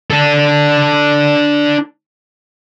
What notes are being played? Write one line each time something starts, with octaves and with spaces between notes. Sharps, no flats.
D4 A4